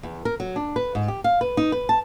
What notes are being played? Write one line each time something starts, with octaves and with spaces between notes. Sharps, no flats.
E2
A#4
F#3
D4
B4
G#2
G4
F5
B4
D#4
B4
A5